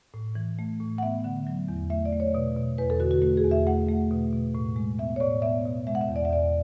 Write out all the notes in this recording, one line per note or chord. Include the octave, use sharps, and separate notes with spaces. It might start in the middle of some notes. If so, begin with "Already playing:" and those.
A2
E3
A3
A2
F#5
B3 E5
D3
F#3
E2
A3 E5
D5
A3
C#5
B2
B2
E2 B4
A4
D3 F#4
F#4
A3 F#4
G#4
E2
E5
A3 F#5
A3
B2
B2
A2
G#3
B3 E5
C#5
A2 D5
B3 E5
B2
G#3 E5
F#5
E5
E2
D5
E5
E2 D5